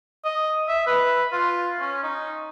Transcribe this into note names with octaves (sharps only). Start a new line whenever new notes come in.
D#5
E5
B4
F4
C#4
D#4